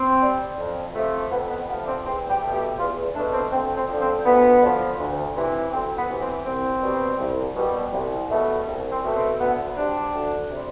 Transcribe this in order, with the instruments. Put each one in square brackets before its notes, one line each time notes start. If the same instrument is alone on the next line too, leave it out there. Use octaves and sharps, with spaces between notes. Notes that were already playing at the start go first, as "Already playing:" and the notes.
Already playing: [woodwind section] C4
G3
F2
C3 F3 A3
F2 B3
B3
C3 F3 A3 B3
D4
C4
E2 C4
G4
B2 A3
G4
E2 F4
A3 D4
B2
C4
D2 C4
C4
D3 F3
C4
D2 B3
D3 F3
D2
C3 E3
D2 C4
B3
C3 E3
C4
C2 C4
B2 G3
C2
B2 G3
C2
B2 A3
C2
C4
B2 A3
C4
D2 B3
C3 G3 D4
D2
C3 G3